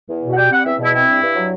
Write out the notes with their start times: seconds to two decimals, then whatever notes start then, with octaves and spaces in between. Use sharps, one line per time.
0.09 E2
0.23 B2
0.33 F#5
0.36 G3 G5
0.51 C4 F#5
0.65 E2 E5
0.79 B2 E4
0.93 C4 E4
1.08 G2
1.22 G2
1.36 F#3